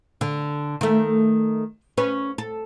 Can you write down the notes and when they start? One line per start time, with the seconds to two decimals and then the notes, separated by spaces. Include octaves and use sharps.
0.21 D3
0.81 D#3 A3
1.98 C#4 B4
2.38 A4